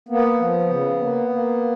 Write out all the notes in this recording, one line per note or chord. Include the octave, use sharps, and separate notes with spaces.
A#3 B3
F3
C#3
A#3
A#3